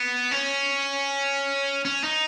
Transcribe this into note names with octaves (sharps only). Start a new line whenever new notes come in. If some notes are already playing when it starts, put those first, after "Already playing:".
Already playing: B3
C#4
C#4
D#4